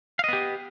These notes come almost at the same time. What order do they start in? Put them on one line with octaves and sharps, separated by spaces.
F5 D#5 B3 G4